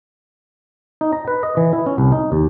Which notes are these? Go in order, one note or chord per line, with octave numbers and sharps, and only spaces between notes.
D#4
A#5
B4
D#5
E3
E4
C#4
C2
D#4
D#2